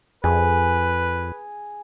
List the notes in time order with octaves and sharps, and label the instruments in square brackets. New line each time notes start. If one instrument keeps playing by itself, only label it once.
[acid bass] F2 [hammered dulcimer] G#4 [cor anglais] B4